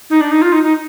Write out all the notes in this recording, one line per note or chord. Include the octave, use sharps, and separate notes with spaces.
D#4
D4
D#4
F4
D#4
D#4